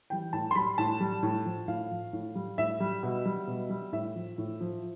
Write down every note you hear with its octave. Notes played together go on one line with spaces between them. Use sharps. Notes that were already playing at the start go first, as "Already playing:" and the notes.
E3 G3 G5
A2 A5
C6
G3 B5
A2 A5
G3
A2
F3
A2 F5
F3
A2
G3
A2 E5
G3
B2
G3
B2
G3
A2 E5
F3
A2
F3